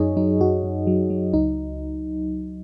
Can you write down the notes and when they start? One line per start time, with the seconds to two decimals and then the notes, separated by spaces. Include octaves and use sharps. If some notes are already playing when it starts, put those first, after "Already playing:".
Already playing: F#2 F#3 D#4 G#4 C#5 D#5
0.17 F#3 D#4
0.40 F#2 F#4
0.64 F#2
0.87 F#3
1.10 F#3
1.33 C#2 D#4